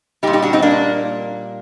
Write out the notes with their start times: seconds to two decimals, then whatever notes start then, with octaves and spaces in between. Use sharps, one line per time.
0.23 G3 D#4 G4
0.27 A#2
0.33 D#4 G4
0.42 D4 F#4
0.53 C4 D#4
0.62 A#3 D4